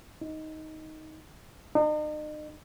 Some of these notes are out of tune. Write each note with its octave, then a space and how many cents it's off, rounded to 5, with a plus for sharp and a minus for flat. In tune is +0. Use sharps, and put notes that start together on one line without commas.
D#4 +10
D#4 -40